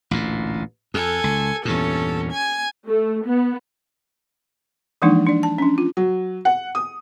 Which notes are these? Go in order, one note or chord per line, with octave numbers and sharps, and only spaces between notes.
A1 D2 A#2
F2 A4 G#5
C#2
E2 G2 A#2 C#4 A4
G#5
A3
B3
E3 F3 G#3 A#3 D4 D#4
D4 D5
A5
C#4 D4
F4
F#3
F#5
D#6